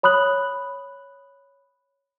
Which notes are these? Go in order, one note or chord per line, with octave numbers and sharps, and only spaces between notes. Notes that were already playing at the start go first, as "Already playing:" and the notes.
C#5 B5 D#6 F#6 F#7